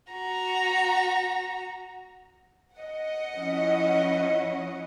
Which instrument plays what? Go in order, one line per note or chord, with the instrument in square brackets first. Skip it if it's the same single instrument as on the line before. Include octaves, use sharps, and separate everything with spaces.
[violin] F#4 A#5
[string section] D#5 F#5
[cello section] F3 C#4 E4